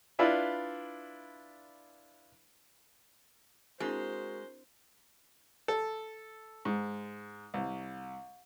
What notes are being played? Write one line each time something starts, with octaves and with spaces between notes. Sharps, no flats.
D4 E4 F4 B4 D5
G#3 C4 D4 E4 F#4 A#4 C5 A#5
A4
G#2
C2